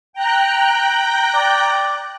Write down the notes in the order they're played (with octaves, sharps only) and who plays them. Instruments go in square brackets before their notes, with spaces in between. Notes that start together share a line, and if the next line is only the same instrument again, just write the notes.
[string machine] G5 A#5 F#6
[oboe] D5